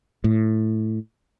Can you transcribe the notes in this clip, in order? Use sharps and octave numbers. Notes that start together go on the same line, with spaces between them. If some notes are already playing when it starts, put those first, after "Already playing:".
A2